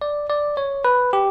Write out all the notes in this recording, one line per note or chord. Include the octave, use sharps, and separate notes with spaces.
D5
D5
C#5
B4
G4